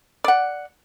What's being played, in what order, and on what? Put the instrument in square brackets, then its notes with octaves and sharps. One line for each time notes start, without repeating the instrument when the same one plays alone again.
[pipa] D5 F#5